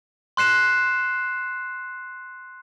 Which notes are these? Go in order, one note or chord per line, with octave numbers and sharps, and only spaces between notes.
C6 F#6 C7 E7